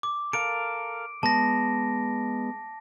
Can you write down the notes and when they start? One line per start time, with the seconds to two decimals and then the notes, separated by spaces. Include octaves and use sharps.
0.03 D6
0.33 A4 A#4 F5 D7
1.23 G#3 B3 A5 A#6